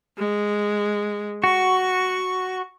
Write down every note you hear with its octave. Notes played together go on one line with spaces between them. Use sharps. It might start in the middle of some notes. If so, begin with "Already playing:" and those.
G#3
F#4 C#6